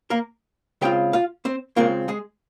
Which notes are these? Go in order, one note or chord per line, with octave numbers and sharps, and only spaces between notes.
A#3 A#4
C#3 G#3 C4 F4 G4 G5
F4 F5
C4 C5
C#3 G#3 A#3 C4 F4 A#4
G#3 G#4